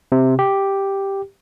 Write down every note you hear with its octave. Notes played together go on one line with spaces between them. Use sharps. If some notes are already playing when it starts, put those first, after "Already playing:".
C3
G4